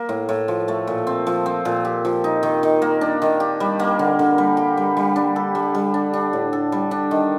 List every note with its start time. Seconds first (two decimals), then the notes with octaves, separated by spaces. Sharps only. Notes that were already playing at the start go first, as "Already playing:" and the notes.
Already playing: A#3
0.09 A2
0.29 A2
0.48 F3
0.68 A3
0.87 A#2
1.07 C4
1.27 F3
1.46 C4
1.65 A#2
1.85 G4
2.05 F3
2.24 D#4
2.43 D#3
2.63 D#3
2.82 A#3
3.01 D4
3.22 D#3
3.40 G4
3.60 G3
3.79 A#3
3.99 D3
4.19 D3
4.38 G3
4.57 G4
4.77 G3
4.97 G3
5.16 D4
5.36 A4
5.55 G3
5.75 G3
5.94 D4
6.13 D4
6.33 A2
6.53 A4
6.72 G3
6.91 D4
7.11 D#3